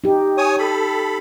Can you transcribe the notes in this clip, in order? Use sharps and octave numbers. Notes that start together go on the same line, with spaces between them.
D#4 G4
C#5 G#5 D#6
A4 B5